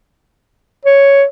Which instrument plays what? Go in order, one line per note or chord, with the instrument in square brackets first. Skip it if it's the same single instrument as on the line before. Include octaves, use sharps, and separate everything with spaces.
[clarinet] C#5